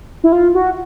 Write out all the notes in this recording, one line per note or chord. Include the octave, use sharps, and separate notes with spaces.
E4
F4
F#4